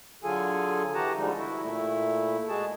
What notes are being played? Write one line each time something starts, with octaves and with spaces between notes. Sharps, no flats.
D3 F#3 F4 G#4 A4 G#5
E3 F#4 G4 F#5 A5 A#5
D3 F3 G3 G#3 D#4
E4 F#4
A#2 A3 E4
G#3 F#4 G#4 A5